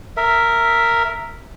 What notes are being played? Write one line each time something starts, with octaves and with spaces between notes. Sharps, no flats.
A#4 E5